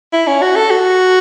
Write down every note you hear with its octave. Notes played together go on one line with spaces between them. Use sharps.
E4
C#4
F#4
A4
F#4